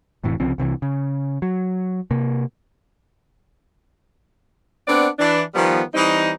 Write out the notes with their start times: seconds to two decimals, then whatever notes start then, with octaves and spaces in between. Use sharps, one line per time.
0.24 F1 A2 C3 E3
0.40 C2 C#3 F3 C4
0.58 C2 C3 D#3 E3
0.82 C#3
1.42 F#3
2.11 C3 A#3
4.87 B3 C4 D4 D5 F#5
5.19 E3 D4
5.55 D#3 F3 G3 B3
5.94 E3 G3 C4 D#4